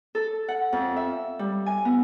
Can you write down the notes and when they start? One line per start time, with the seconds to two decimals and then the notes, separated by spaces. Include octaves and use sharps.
0.15 A4
0.48 F#5
0.73 F2
0.96 E5
1.39 G3
1.66 G#5
1.85 B3